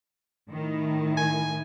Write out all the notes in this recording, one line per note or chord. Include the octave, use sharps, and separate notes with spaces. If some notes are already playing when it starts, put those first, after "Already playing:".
A2 D#3 E4
G#5